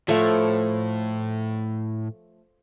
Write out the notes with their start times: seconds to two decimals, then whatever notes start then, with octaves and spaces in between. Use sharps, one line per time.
0.08 A2 F3 A3 C#5